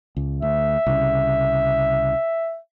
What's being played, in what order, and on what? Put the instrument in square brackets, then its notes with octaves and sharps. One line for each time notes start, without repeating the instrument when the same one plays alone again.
[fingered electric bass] C#2
[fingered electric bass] D2 [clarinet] E5
[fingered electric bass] C2 C#3